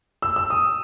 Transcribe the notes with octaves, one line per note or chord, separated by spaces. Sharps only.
E6
E6
D#6